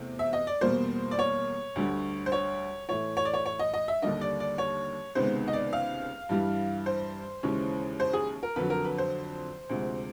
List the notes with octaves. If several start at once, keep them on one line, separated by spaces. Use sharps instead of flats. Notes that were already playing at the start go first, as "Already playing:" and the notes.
Already playing: E2 C3 A3
E5
D#5
D5
E2 B2 G3 A#3 C5
D5
C#5
D2 D3 G3
C5
C#5
A2 E3 A3 C#5
C#5
D5
C#5
C#5
D#5
D#5
E5
D#2 D3 G3 A#3 D4 D#5
D5
D5
C#5
C#2 C3 D#3 G#3 B3 C5
D#5
D5
F5
G2 E3 G3
C5
D#2 C#3 E3 G#3 C#4
C5
G#4
A#4
F2 D3 F#3 B4
A#4
B4
C5
D2 C3 F3 G#3